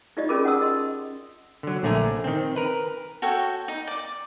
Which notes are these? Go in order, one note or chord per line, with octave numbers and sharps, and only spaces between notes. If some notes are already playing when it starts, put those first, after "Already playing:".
D#4 F4 G4 D5 D#5
C#4 F4 G#4 A#4 B5 D6
F#5 A5 D#6 E6
D#5 C6
D3 F#3
A#1 D3 A3 D5 G#5 A#5
D#3 C4
A#4 B4
F#4 A4 C#5 G5
D#4
D5 D6